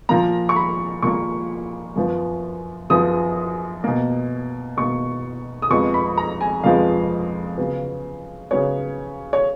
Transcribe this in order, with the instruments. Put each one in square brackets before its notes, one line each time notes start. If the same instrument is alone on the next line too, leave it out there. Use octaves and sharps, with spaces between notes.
[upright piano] A#2 F3 A#3 A#5
C#6
B5
A#2 F3 A#3 C#6
F#2 F3 B3
F#2 F3 B3 D#6
B2 A#3
B2 A#3 C#6
D#6
F2 F3 G#3 B3 C#6
B5
A#5
G#5
F2 F3 G#3 B3 F5
C#3 F#3 B3
C#3 F#3 B3 C#5
C#5